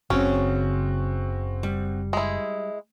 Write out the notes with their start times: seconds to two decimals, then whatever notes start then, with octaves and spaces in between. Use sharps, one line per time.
0.10 F#1 C#3 C4 C#4 F#4
1.63 G3
2.13 G#3 E4